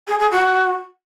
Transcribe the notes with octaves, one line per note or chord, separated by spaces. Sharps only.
G#4
G#4
F#4